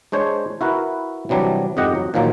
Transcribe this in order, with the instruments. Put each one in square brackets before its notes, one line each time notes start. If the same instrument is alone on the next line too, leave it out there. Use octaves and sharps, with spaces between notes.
[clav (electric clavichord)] G#3 D4 C5 C#5
E4 F#4 A#4 B4
C3 E3 F#3 G3 D4
F2 G#2 G4 D#5 F#5
F#3
A#2 D#3 F3 F#3 A#3